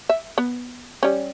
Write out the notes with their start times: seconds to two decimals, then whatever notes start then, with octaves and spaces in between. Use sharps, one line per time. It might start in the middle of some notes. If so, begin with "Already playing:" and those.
0.09 E5
0.38 B3
1.03 G3 C#4